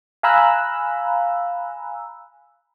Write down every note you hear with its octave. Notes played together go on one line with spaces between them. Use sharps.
F5 G#5 A#5 B5 E6 F#6